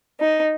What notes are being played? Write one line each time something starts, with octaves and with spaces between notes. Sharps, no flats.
D#4